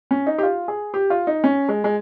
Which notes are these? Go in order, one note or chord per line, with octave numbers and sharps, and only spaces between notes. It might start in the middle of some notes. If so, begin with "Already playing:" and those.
C#4
D#4
G4
F4
G#4
G4
F4
D#4
C#4
G#3
G#3